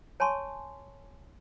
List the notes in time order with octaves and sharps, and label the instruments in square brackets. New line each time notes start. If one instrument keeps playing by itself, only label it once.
[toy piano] C#5 G#5 A5 C6 C#6